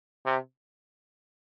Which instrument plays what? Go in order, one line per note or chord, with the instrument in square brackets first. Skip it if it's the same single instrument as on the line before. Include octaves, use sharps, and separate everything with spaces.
[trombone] C3